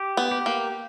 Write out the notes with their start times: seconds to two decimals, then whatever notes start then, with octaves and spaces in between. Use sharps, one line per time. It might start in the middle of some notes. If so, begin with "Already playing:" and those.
Already playing: G4
0.17 B3
0.31 G4
0.46 A#3